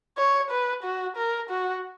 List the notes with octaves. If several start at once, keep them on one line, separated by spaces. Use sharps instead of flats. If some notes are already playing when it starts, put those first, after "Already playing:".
C#5
B4
F#4
A#4
F#4